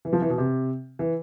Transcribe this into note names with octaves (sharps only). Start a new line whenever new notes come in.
E3
F3
E3
B2
C3
E3